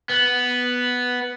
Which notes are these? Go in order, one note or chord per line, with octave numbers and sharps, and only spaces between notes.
B3